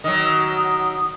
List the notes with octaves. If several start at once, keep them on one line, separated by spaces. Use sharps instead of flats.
D#3 F#3 D#6